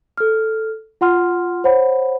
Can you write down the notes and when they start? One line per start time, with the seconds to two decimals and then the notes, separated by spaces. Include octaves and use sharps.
0.18 A4 F6
1.01 F4 F#5 C6 F6
1.64 C5 C#5 F#5 B5